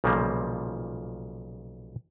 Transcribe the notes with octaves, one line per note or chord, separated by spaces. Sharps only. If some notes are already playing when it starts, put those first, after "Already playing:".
B1 A#2 C#3 F3 G3 A#3